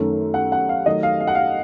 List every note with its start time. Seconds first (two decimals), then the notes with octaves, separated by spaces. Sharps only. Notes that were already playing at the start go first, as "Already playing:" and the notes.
Already playing: F#2 D#3 A3 C#4
0.34 F#5
0.52 F#5
0.69 F5
0.86 D#3 F#3 A3 D#5
1.03 F5
1.20 F5
1.27 F#5
1.35 F5